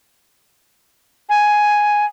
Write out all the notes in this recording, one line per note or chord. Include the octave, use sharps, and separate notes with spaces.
G#5